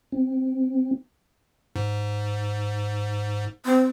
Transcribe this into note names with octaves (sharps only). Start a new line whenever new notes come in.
C4
G#2
C4